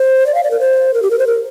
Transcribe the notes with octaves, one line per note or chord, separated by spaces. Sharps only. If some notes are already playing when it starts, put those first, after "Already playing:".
Already playing: C5
D5
F5
D5
A#4
C5
A#4
G4
A#4
C5
A#4